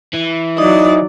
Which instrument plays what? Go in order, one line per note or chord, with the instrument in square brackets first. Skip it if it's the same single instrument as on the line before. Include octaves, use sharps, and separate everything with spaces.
[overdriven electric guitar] E3
[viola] F#3 D5 [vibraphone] D#4 [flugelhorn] D#5